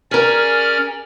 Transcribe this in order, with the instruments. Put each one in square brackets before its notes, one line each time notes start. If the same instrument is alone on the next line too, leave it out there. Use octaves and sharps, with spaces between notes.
[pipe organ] C#4 D5 F6 [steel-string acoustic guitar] G#4 A#4